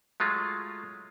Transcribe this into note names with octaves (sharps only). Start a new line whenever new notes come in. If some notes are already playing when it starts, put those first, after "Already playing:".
F#3 G#3 A3 F4